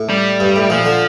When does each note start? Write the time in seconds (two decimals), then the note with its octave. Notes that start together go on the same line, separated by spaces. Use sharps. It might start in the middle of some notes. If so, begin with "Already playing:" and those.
Already playing: A2
0.09 G3
0.40 G2
0.56 A2
0.70 A#2 F3
0.85 D3